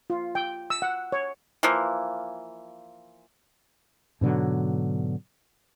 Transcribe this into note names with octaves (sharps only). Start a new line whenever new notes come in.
F4
G5
E6
F#5
C#5
E3 F3 A#3
G#2 B2 D3 F#3